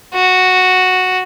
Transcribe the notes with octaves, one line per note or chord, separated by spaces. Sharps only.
F#4